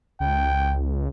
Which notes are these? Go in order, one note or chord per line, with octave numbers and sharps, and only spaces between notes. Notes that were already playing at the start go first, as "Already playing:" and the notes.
C#2 G5